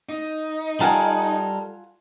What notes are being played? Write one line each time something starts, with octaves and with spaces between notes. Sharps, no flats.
D#4
G3 F4 A4 A#4 F#5 G#5